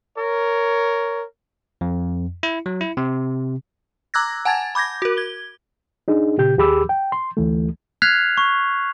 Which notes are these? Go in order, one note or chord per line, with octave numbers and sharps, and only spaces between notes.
A#4 C#5
F2
E4
F#3
E4
C3
A#5 D6 E6 F#6 G#6 A#6
F#5 G#5 A5 G#6 A6
B5 D6 G6 G#6 A#6
F#4 A#4
G#6 G7
D4 D#4 G#4
A#2 C#3 G4 G6
D#2 G4 G#4 B5 D6 E6
G5
C6
D2 E3 A3
F6 F#6 G#6 B6 C7 F7
C#6